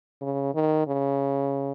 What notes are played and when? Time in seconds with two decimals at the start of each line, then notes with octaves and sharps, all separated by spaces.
0.21 C#3
0.55 D#3
0.87 C#3